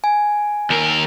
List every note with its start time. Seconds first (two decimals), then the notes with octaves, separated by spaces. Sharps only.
0.04 G#5
0.70 D#2 A#4